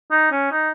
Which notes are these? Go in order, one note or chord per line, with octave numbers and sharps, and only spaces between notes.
D#4
C#4
D#4